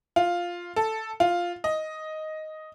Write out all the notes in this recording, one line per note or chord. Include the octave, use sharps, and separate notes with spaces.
F4
A4
F4
D#5